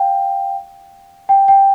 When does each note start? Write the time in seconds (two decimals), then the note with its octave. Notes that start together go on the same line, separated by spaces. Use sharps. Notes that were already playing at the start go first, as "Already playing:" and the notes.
Already playing: F5 G5
1.29 G5
1.48 G5